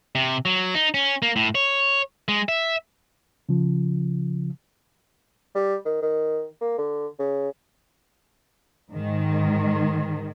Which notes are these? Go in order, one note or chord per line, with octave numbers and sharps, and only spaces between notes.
C3
F#3
D#4
C#4
A#3
A2
C#5
G#3
E5
C#3 F3
G3
D#3
D#3
A#3
D3
C#3
G#2 D#3